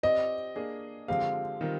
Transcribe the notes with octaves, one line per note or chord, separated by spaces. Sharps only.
C4 G4 D5 D#5
A#3 D4 G#4
D3 F3 G#3 C4 G4 F5
D#3 G3 C4 F4 A#4